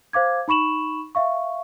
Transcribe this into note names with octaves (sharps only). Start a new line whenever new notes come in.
C5 F5 D6 G#6
D#4 B5 C#6 E7 F#7
E5 F5 C#6